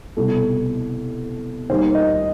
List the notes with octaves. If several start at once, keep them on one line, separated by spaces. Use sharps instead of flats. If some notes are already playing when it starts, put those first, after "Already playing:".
C2 B2 G3 A4
D#2 D#3 G3 C5
D#5